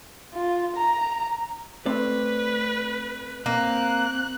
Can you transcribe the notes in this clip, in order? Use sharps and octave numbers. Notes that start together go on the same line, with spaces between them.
F4
A#5
A3 C4 B4 D5
A#3 C4 F#6